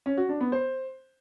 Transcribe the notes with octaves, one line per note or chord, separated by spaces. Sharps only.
C#4
F#4
D4
B3
C5